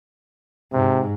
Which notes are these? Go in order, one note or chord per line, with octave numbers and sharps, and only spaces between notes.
G#2 C3